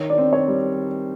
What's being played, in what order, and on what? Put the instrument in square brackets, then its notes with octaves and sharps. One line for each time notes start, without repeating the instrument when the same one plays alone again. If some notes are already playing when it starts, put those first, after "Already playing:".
Already playing: [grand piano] D#3 [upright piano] C#5
[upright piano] D5
[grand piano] C4
[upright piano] C#5
[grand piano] G3